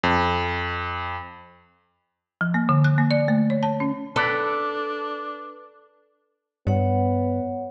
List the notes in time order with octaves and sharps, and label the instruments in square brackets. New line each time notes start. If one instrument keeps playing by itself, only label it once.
[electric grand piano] F2
[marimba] F3
A#3
D3
F#6
A#3
D5
A3
C#5
A5
C#4
[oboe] D4 [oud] A4 [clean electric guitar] B4 D5
[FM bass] G2 [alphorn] B3 [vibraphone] C#5 F#5